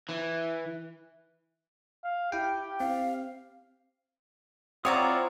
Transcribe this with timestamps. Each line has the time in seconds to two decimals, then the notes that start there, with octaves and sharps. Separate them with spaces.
0.09 E3
2.04 F5
2.32 E4 G4 G5
2.80 C4 F5
4.85 C4 E4 F4 C#5 D5 F#5 A#5 D#6